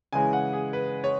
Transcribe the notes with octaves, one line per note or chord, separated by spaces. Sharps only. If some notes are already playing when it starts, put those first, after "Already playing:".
C#3 E3 G#3 C#4 G#5
F#5
G#4
B4
C#5